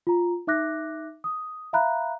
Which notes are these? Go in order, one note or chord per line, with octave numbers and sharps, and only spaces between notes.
F4 A#5
D#4 E5 D6 F#6 A#6
D#6
E5 F5 A#5 B5 F#6